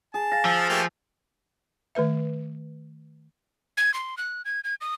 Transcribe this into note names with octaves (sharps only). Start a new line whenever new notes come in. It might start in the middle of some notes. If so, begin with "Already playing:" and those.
G#4 A5
F5 A6 A#6
F3 E6
A3 A#3 G4
D#3 A3 B4 E5
G#6
C6
F#6
G#6
G#6
D#6